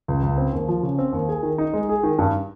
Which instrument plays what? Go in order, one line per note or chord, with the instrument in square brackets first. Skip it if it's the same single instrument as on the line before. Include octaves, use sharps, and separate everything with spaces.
[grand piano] C#2
C#2
C4
D#2
F3
C#3
C4
D#2
G#4
D#3
D#4
G#3
G#4
D#3
G2